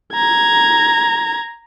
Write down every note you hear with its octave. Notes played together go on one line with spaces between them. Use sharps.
A#5 G#6